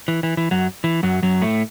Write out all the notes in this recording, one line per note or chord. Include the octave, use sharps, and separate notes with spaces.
E3
E3
E3
F#2 F#3
E3
F#2 F#3
F#2 F#3
A2 A3